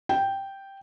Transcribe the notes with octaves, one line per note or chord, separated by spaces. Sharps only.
G5